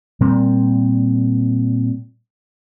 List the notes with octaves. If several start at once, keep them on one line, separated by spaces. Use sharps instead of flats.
A#2 G3 C4